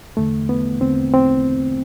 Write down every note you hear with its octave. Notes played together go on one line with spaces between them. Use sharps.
E2 D3 A3
B3
E2 D3 C4
C4